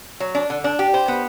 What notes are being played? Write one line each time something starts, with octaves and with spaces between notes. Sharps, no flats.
F#3
D4
D3
D4
G4
C5
B3